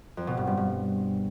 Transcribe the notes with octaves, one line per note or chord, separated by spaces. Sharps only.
F2
B2
G2
G2
G2